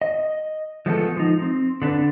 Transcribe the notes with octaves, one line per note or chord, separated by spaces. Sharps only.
D#5
F3 G#3 A3 B3 F4 A4
F3 D#4
C4
D3 D4 B4